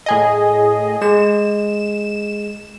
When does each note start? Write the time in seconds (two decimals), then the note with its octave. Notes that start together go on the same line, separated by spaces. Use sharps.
0.06 A2 G#4 D#5
1.02 G#3 E7